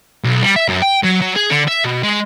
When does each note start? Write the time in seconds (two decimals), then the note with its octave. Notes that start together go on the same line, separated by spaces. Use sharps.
0.24 B1
0.43 G3
0.56 E5
0.68 F#2
0.82 G5
1.04 F#3
1.21 F#3
1.36 G#4
1.50 D3
1.68 E5
1.84 B2
2.03 G#3